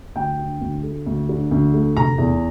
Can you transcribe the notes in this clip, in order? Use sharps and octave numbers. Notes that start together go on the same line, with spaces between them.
D2 G5
D3
D2
A3
D2
D3
D2
A3
F1 A#5
E2